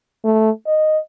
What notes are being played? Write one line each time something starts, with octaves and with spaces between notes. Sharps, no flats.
A3
D#5